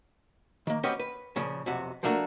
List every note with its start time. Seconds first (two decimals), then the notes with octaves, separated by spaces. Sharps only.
0.67 D#3 A#3
0.83 C4 C#4 F#4 G4 B4 D#5
0.99 B4
1.36 A#2 C#3 F3
1.66 B1 F2 C3 F#4
2.03 F3 A3 A#3 D4 F#4